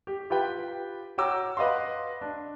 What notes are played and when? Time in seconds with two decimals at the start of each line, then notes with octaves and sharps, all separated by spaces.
0.07 G4
0.30 F4 G4 B4 G5
1.18 F#4 C#5 G5 A#5 D6 E6
1.57 B4 D#5 F5 F#5 C6
2.21 D4